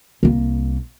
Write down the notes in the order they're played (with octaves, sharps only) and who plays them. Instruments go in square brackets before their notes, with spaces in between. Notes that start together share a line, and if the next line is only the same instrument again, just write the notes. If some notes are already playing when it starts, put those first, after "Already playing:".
[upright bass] C2 A#3